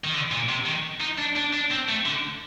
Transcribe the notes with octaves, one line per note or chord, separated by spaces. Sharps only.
D#3
D3
A#2
C3
D#3
D#4
D4
D4
D4
C4
A3
D3